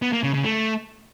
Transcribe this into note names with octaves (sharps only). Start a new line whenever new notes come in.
B3
A#3
C#3
C#3
A3